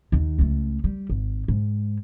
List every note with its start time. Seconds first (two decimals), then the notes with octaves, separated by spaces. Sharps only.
0.12 D#2 D#3
0.39 C#2 A3
0.84 G3
1.10 G#1
1.48 G#2